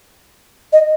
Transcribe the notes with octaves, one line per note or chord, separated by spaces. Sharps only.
D#5